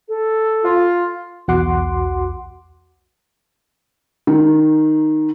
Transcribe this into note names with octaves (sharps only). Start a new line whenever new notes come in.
A4
F4
B1 E2 F#4 F#5 C6 D6
D#3